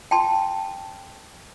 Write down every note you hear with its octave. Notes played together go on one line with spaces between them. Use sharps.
G5 A5 C6